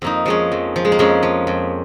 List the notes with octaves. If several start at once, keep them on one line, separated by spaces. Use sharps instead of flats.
F2 A#3 D#4
F3 G#3 C#4
F2
F3
G#3
A#3
F2 G#3 C#4
F3
F2